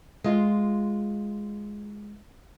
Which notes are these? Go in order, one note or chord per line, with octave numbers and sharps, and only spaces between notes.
G#3 F4